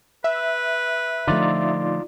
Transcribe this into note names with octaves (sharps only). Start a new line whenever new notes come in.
B4 E5
D3 F3 A3 D#4 F4 D5